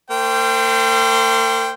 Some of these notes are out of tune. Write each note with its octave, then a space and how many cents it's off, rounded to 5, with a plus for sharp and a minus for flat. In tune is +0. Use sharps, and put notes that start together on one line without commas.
A#3 -45 C5 -10 G5 +0